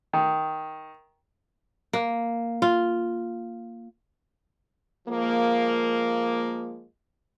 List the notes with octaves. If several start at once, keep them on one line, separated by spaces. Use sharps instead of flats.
D#3
A#3
F4
F3 G#3 A#3